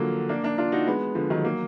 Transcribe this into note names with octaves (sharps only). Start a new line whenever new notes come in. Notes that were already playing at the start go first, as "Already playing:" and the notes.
Already playing: D3 F3 F#3 A#3
A#3 D4
A#3 D4
D4 F4
D#4 F#4
G#3 B3
D3 F3
D#3 F#3
F#3 A#3